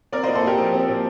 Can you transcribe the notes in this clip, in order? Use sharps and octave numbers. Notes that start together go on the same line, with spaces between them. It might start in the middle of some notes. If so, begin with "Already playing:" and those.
C4 A#4 D5
A#2 C5 D#5
A4 C5
A#2 G4 A#4
F3
C4
A#2